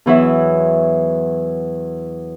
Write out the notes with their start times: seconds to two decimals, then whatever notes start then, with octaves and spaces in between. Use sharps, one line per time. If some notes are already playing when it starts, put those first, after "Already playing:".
0.06 E2 E3 F#3 E5